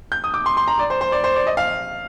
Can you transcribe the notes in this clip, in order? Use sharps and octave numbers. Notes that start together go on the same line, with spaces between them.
G6
D#6
D6
C6
C6
A#5
D5
C5
C5
D5
C5
D5
D#5
F5